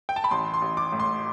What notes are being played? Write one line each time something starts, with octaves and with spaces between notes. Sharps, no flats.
G5
A5
B5
A1 C6
C6
A1
D6
A2
C6